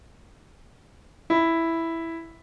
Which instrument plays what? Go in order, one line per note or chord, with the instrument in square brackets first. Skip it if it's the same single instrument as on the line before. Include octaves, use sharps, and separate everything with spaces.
[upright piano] E4